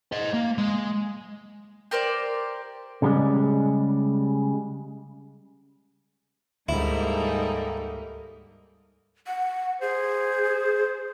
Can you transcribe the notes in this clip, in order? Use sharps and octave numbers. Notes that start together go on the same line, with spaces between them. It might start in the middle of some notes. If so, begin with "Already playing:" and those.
C5 D#5
A#3
G#3
G4 A#4 C5 D5
C#3 G3 G#3
D2 G#2 G3 A#3 D#4 E4 A4
F#5
G#4 C5